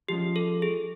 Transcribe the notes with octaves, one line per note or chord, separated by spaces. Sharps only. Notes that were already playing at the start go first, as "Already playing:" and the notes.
F3 G#3 C#4 G4
A4
G#4